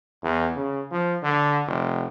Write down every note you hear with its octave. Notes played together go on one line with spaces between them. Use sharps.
E2
C#3
F3
D3
F1